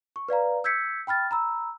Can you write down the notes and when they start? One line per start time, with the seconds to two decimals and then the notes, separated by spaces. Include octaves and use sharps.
0.16 C#6
0.29 B4 D5 F5 A#5
0.64 E6 G6 G#6 B6 C#7
1.07 G5 B5 F6 A6
1.31 A#5 B5 E6